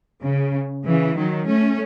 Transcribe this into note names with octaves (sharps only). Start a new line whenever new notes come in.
C#3
C#3 E3
D#3 F#3
A3 C#4